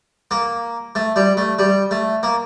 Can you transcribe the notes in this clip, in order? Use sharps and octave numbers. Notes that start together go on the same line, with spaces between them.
A#3
A3
G3
A3
G3
A3
A#3